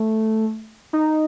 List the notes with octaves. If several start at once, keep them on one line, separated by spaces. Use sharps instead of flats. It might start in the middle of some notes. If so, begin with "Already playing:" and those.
Already playing: A3
D#4